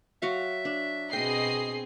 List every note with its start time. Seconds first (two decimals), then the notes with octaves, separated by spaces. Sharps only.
0.22 F#3 F#4 E5 F5
0.65 D4
1.13 B2 C4 G#4 D#5 G5 C7